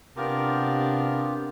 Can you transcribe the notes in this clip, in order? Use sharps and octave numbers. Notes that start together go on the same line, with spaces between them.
C3 B3 D4 F4 G4 A#4